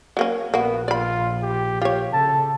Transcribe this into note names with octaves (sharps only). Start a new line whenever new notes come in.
F#3 A#3 C#4
A#1 A#3 B3 F#4
F4 D5 B5
G4
F4 G4 C#5
C#3 A4 A5